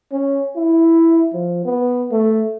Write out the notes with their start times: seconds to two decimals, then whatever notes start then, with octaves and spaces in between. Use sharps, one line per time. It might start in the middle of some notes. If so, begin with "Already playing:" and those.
0.12 C#4
0.56 E4
1.33 F3
1.65 B3
2.11 A3